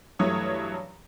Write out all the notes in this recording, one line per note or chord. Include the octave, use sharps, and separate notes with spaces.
G2 E3 F#3 A3 C#5 D#6